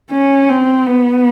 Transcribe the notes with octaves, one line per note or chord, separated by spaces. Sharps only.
C#4
C4
B3